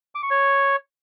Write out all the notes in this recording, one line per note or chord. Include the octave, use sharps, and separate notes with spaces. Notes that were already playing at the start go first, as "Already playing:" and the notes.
D6
C#6
C#5